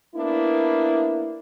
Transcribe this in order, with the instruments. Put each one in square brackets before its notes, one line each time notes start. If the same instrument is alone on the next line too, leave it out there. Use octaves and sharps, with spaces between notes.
[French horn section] A#3 B3 D4 E4